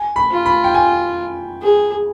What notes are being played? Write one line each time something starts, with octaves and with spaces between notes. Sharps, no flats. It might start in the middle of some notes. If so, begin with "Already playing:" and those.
Already playing: G#5
B5
F4
B5
G5
G#5
G#4